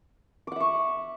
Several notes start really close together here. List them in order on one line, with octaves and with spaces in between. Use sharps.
D6 F#5 E5 C#6